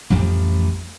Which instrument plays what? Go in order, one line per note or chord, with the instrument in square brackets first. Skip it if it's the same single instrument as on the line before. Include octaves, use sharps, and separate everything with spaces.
[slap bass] A1 F2 F3 G3